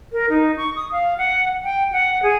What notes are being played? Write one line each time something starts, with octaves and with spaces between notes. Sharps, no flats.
A#4
D#4
C#6
D#6
F5
F#5
G5
F#5
G#4